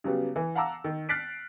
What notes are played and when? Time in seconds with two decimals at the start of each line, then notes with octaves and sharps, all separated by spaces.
0.04 C#3 F#3 G3 B3
0.36 E3
0.55 F5 F#5 A5 A#5 D6 E6
0.84 D#3
1.09 F6 F#6 A6 B6 C7 D7